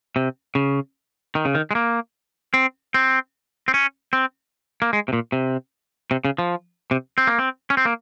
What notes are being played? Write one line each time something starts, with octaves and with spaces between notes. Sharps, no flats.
C3
C#3
D#3
C#3
D#3
G#3
A#3
C4
C4
C4
C#4
C4
A#3
G#3
C3
A#2
C3
C3
C#3
F3
C3
C4
A#3
C4
C#4
C4
A#3